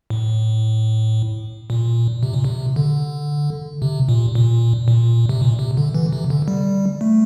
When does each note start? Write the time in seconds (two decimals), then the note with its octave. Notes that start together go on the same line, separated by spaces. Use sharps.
0.10 A2
1.70 A#2
2.23 C3
2.33 A#2
2.44 C3
2.76 D3
3.82 C3
4.09 A#2
4.35 A#2
4.88 A#2
5.29 C3
5.42 A#2
5.59 C3
5.77 D3
5.94 E3
6.13 C3
6.30 D3
6.48 G3
7.01 A3